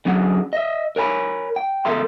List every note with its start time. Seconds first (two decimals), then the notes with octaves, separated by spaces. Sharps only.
0.05 D3 F#3 C#4 G#4 F#5
0.53 D#5 E5
0.96 A#4 C#5 G#5 B5
1.56 G5
1.85 C#2 A4 A#4 E5 C6